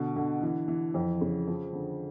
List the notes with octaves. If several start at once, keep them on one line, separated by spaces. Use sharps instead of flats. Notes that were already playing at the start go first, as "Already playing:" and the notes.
Already playing: B2 D3
D3
E3
E3
F2
C#3
F3
D3